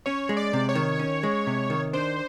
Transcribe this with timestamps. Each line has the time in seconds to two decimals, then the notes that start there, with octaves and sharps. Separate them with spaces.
0.06 C#4 C#5
0.29 G#3
0.37 D5
0.53 C3
0.69 C#5
0.75 D#3
0.99 C#4
1.23 G#3
1.47 C3
1.70 D#3
1.93 D4 C5